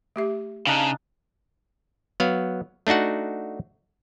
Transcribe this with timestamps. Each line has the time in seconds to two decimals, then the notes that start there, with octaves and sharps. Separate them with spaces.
0.16 A3 G4 E5
0.67 C#3 D4 D#4 F5
2.20 F#3 B3 F5
2.87 A3 D4 D#4 F#4 F#5